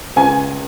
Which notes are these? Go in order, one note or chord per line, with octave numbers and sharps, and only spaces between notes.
C#2 G#5